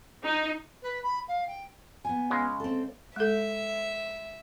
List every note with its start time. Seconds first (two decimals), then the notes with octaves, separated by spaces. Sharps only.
0.23 D#4
0.82 B4
1.03 B5
1.28 F5
1.47 G5
2.05 B3 G#5
2.31 C#3 G#3
2.60 C4 A4
3.16 G#3 A4 E5